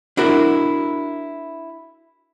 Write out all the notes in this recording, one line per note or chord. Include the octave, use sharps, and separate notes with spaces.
D4 E4 F#4 A#4